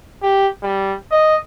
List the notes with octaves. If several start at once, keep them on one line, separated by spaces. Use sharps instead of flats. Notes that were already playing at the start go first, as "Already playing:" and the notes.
G4
G3
D#5